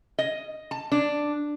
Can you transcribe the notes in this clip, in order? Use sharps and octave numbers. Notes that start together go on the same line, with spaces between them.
D#5
A5
D4